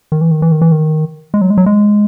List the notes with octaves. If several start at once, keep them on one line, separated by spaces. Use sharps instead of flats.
D#3
E3
D#3
E3
D#3
E3
D#3
G#3
F#3
G#3
F#3
G#3